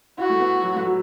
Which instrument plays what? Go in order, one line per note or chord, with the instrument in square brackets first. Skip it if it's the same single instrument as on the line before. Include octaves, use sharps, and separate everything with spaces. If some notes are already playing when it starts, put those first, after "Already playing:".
[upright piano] E4 [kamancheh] F#4
[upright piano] A3
B3
F#3
A3
F#3